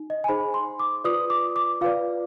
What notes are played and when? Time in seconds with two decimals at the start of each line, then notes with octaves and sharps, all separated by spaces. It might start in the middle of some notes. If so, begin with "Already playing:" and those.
Already playing: D#4
0.10 D#5
0.24 G#5
0.28 D#4 G#4 C5 B5
0.54 C6
0.80 D6
1.04 F4 B4 D5 D#6
1.30 D6
1.56 D6
1.81 F4 B4 D5 F5